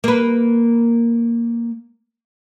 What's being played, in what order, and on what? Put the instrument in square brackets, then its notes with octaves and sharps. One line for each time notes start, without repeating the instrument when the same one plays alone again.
[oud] A#3 B4